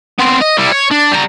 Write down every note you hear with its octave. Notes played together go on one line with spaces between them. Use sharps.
B3 C4
D#5
G3 E4
C#5
D4
G3 A#5